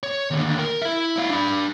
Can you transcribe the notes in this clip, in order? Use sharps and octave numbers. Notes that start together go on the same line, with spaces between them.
C#5
D#2 D3
A#4
E4 E5
E4 F5
D4 B5